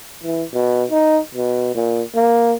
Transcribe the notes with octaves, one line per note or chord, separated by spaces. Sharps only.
E3
B2
D#4
B2
A#2
A#3